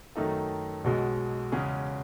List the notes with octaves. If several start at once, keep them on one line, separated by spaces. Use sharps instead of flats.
F#2 D#3 A3 D#4 A4
B1 B2 G#3
E2 C#3 G#3 C#4 G#4